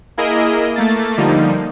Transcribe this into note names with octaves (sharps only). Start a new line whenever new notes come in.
A#3 E4 G#4 A#4 D#5
A3 A#3 A6
D3 F3 G3 A#3 D#4